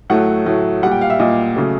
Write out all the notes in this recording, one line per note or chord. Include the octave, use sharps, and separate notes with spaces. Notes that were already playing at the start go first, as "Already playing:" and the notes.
A2 F#3 A3 F#5
A2 F#3 A3
A#2 G3 F#5
G5
F5
E5
A#2 G3 D#5
C#3 F#3 A3